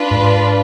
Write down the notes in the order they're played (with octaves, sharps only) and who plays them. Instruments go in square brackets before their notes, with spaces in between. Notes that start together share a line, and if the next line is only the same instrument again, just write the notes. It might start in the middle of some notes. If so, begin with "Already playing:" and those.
Already playing: [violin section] D4 F4 B4
[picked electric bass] G#2